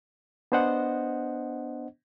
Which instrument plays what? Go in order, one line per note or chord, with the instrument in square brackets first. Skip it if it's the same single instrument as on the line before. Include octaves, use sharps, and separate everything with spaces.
[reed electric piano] B3 D4 C5 D#5 F#5